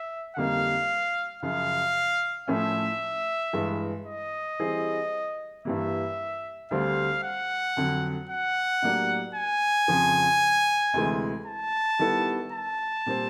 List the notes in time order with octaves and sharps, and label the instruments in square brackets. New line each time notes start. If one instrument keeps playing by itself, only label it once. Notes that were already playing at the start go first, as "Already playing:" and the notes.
Already playing: [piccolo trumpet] E5
[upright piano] F2 D3 G3 A#3 D#4 [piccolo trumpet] F5
[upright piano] F#2 C#3 F3 [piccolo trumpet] F5
[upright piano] A2 F3 A3 C#4 [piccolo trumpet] E5
[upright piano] G2 E3 G#3
[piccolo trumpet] D#5
[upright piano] E3 G3 C4 E4 G#4
[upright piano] G2 E3 G3 A#3 [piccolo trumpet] E5
[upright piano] D2 D3 G3 C4 [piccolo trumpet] F5
[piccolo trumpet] F#5
[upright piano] F2 D3 F#3
[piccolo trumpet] F#5
[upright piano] A2 F#3 A#3 D4 G4
[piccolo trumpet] G#5
[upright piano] F2 C#3 F3
D2 C3 E3 G#3
[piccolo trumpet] A5
[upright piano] D#3 G3 B3 E4 A4
[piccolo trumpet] A5
[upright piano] A#2 G3 C4